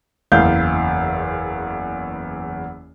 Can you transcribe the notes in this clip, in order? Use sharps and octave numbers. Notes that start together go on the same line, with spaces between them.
F#1 E2 F5 G6